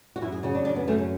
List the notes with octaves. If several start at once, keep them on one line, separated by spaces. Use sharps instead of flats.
F#4
F#2 E4
G#4
C#3 F#4
D4
F#2 D4
B3
F#2 A3
C#4